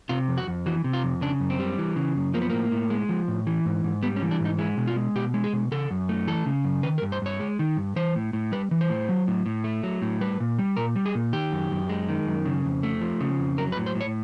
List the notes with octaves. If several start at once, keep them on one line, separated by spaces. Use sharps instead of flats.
C3 F4
F2
F#4
F2
E3 F#4
C3
F4
F2
C#3 D4
F#2
C4
G3
E3
C#3
F#2
F3 A#3
B3
A2 A#3
A2
G#3
F3
A2
E3
G#2
G#2
G3 B3
C#4
E3
D4
G#2
D#4
G#3 E4
B2
F4
G#3
B2 G4
G#3
G#4
B2
C#3 A4
F#2
A3
E3 A4
C#3
F#2
D#3 B4
A#4
G2
C5
G2 C#5
G#3
D#3
G2
E3 C5
A2
A2
G3 B4
E3
C5
A2
F#3
A2
A2
A3
F#3
A2
G3 B4
A#2
G3
A#2 A#4
G3
G#4
A#2
D#3 G4
F#2
F#2
G#3
D#3
F#2
C#3
F2
A3
F3
C#3
F2
F#3 A#4
B4
A2
C5
A2
C#5